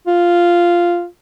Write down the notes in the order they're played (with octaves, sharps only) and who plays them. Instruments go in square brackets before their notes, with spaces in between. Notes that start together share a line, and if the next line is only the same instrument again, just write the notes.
[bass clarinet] F4